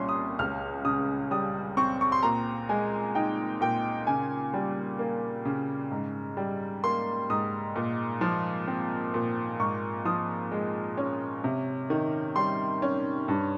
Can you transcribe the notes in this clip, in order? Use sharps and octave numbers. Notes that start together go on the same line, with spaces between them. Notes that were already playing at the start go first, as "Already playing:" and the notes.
Already playing: C2 A#2 G3 C#4 C6
D#6
C#2 F6
C#3 D#6
G3 D#6
C4 C#6
C#6
C6
A#2 A#5
G#3 G#5
D#4 G5
A#2 G5
C#3 G#5
G3
A#3
C#3
G#2
G3
A#3 C6
G#2 D#6
A#2
F3
C4
A#2
G#2 C#6
F3 D#6
G#3
C#4
C3
D#3
G3 C6
C#4
G2